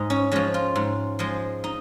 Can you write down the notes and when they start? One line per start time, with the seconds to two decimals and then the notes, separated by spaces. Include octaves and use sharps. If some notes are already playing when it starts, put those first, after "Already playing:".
Already playing: G#2 G#3 D#4
0.10 C#4
0.32 F3 G#3 C#4
0.54 F4
0.76 G#2
1.19 F3 G#3
1.64 D#4